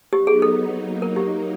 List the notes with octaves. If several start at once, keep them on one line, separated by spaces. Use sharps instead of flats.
F#3 B3 D#4 G4
G#4
A4
F#3 A#3 D#4
A#4
G4